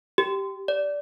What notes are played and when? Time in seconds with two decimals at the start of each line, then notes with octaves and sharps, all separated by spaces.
0.18 G4
0.68 D5